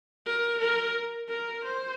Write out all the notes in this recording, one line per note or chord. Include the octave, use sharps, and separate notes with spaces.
A#4
A#4
A#4
C5